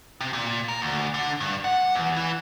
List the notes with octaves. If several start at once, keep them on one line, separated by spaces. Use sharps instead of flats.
C3
A#2
A#4
D2
D3
G2
F#5
E2
E3